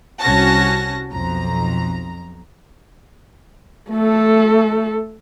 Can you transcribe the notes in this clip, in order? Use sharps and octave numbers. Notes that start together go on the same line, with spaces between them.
C2 C#4 F#4 A5 A#6
B1 F2 A#5
A3 A4